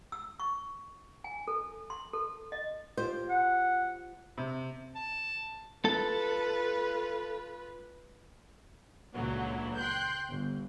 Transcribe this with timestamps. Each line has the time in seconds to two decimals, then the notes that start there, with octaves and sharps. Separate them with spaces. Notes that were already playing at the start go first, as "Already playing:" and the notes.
0.12 E6
0.40 C#6
1.24 G#5
1.48 A4
1.90 C6
2.13 A4
2.52 D#5
2.97 F4 G4 C5
3.29 F#5
4.38 C3
4.96 A5
5.85 F4 A4 B4
9.13 C#2 A#2 D3 E3 F#3
9.76 G5 C6 F#6 G6
10.27 G1